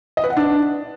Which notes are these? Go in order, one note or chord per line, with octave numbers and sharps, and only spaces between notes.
D#5
B4
F#5
D4